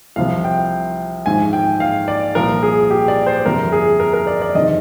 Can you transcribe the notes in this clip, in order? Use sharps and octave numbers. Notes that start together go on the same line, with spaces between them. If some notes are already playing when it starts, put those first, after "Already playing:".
C2 C3 F3 F5
G5
G#1 G#2 F3 G#5
G5
F5
D5
C2 A#2 F3 A#4
G#4
G4
D5
C5
G1 F2 C3 F3 A#4
G#4
A#4
A#4
D5
D5
G1 F2 C3 D#3 D#5